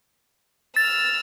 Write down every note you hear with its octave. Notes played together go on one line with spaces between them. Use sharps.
E6 F6 A6